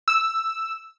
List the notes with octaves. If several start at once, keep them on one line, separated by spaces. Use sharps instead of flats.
E6